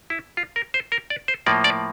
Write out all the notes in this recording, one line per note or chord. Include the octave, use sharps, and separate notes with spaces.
E4
F4
A#4
C5
A#4
D5
C5
A2 F3 A#3 D5
D5